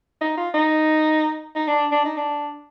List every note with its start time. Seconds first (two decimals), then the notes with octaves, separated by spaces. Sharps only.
0.21 D#4
0.37 F4
0.54 D#4
1.56 D#4
1.68 D4
1.92 D4
2.05 D#4
2.18 D4